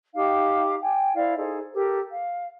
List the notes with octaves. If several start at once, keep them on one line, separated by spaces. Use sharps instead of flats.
D#4 G4 F5 D6
G5 G#5
E4 C5 D5 F5
D#4 G#4 A4 C5
G4 A4 A#4
F5